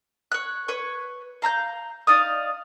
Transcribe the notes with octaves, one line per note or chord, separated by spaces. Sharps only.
C#5 F#6
B4 C#5 C#6
F5 A#5 E6 G6
D#4 D5 F5 D#6